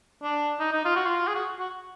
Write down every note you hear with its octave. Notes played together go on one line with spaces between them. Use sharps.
D4
D#4
D#4
F4
F#4
F4
G#4
F#4
F#4